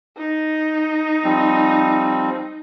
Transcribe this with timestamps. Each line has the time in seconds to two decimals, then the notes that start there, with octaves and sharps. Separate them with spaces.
0.18 D#4
1.24 F3 G3 C4